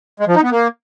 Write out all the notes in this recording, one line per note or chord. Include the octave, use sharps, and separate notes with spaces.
G#3
F3
D#4
B3
A#3